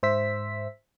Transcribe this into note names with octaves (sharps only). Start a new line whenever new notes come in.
G#2 C5 E5 E6 B6